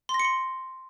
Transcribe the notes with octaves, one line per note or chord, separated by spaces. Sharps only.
C6
A#6
C#7
C6